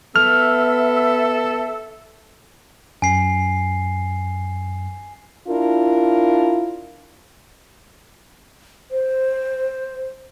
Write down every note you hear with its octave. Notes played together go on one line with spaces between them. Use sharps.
B3 A4 E5 E6 F6
F#2 G#5 C7
D4 E4 F4 A#4
C5